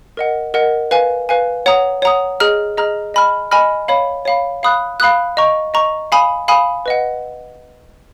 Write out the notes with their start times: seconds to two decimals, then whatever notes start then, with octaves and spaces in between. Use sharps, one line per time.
0.17 A#4 D#5 F#5
0.54 A#4 D#5 F#5
0.91 B4 F5 G#5
1.29 B4 F5 G#5
1.66 C#5 F#5 A#5 D#6
2.02 C#5 F#5 A#5 D#6
2.40 G#4 D#5 A#5 F6
2.77 G#4 D#5 A#5 F6
3.14 D#5 G#5 B5 F6
3.51 D#5 G#5 B5 F6
3.88 C#5 F5 B5
4.25 C#5 F5 B5
4.63 F5 B5 D#6 F#6
5.00 F5 B5 D#6 F#6
5.37 D#5 A#5 C#6
5.74 D#5 A#5 C#6
6.12 F5 G#5 B5 D#6
6.48 F5 G#5 B5 D#6
6.86 B4 D#5 F#5